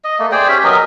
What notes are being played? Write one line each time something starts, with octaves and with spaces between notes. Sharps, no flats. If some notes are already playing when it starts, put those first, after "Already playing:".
D#5
A3 A#3
G#4 C5 D5 G5
C#4 G4 E5
F#3 B3 A#4 D#5